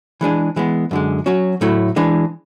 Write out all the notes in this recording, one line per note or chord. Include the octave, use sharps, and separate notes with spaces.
E3 G#3 D4 G#4
E3 G#3 B3
F#2 D3 G#3
F#3 C#4 F#4
A2 F#3 A3 E4
E3 G#3 D4